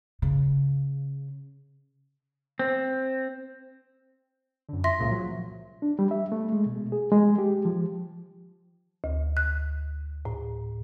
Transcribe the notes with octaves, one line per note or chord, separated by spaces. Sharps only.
C#3
C4
F#2 D3
E5 C6 A#6
C#2 A#2 C#3
F3 F#3
D4
G3
E5
A3
G#3
B2
G#4
G#3
G4
F3
D2
F#6
A2